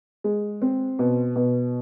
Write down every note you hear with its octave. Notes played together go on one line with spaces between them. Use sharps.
G#3
C4
B2
B2